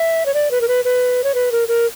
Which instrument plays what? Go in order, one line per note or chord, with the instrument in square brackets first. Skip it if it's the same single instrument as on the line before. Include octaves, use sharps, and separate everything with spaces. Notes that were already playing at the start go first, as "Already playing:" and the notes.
Already playing: [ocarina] E5
C#5
D5
B4
A#4
B4
B4
C#5
B4
A#4
A#4